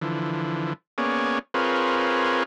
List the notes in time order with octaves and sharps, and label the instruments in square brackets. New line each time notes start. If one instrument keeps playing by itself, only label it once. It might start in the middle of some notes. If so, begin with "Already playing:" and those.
[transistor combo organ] D3 E3 F3
A#3 B3 C#4 G#4 C#5 D5
C4 F4 G#4 A#4 B4 C#5